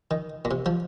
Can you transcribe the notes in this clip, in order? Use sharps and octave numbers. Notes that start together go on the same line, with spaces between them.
D#3
A#2
C3
F3